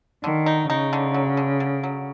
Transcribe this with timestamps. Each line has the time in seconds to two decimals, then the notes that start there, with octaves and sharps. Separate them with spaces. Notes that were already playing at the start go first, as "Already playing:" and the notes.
0.23 D3 D#3
0.46 D#4
0.69 C#3 D#4
0.93 D3
1.14 F#3
1.37 D3
1.60 D3
1.83 F#3